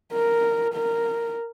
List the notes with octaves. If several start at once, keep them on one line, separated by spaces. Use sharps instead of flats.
A#4
A#4